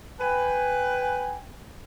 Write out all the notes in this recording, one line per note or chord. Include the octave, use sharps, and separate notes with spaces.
B4 G5 G#5